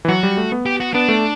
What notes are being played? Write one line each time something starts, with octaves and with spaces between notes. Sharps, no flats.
E3
F#3 F#4
G3
A3
B3
G4
F#4
B3 D4
A3